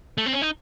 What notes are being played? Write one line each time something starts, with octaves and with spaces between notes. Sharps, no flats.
A3
C4
C#4
D#4